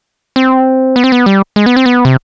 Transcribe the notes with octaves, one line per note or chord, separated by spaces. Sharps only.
C4
B3
C4
B3
G3
G#3
B3
C4
B3
C3